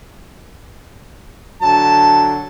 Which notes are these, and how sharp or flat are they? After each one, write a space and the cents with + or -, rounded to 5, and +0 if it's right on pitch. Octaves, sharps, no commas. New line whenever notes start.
D3 +0 F#3 +0 A5 +0